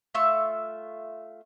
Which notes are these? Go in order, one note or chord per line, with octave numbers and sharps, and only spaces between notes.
A3 F4 E5 C#6